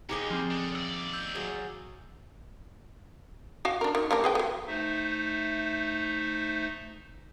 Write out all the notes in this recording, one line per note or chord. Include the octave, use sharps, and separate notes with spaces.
D#2 G4 G#4 D#5 A#5 D6 G7
F3 C4
D3 D4
D#2 D5 E6
E6 G6
F#3 G#4 F5
F#4 F5 G#5
D4 A#4
D#3
G3 A#3 D4
G#4 B4 G5
F#3 A3
A3 D#4 C5 E5